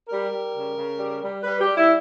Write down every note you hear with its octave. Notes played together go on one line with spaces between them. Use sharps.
G3 A#4
G3
C#3
C#3
G3
G3
G3 B4
G4
G3
E4